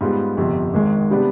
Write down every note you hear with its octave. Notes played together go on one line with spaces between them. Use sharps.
G#2 G3 B3 F4
G1 F2 C3
G#1 G#2 D#3 G#3
C3 G3 B3 D4